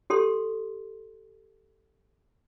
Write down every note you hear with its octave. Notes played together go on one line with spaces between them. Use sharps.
G4 A4 C6